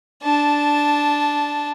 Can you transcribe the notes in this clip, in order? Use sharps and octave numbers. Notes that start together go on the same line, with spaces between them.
D4 A5